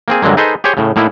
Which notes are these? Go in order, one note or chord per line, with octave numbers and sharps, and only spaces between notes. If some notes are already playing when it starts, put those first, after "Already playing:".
A#3 C4 G#4
G2 D3 F#3 G#3 A#3
D#4 G#4 A4 B4 C5 D#5
G4 G#4 C5 C#5 G5
A2 C#3
A2 A#3 D#4 E4